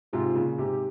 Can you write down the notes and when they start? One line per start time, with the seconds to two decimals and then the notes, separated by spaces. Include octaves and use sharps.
0.13 G#2 C3 F4
0.35 A#2 C#3
0.58 G#2 C3 G4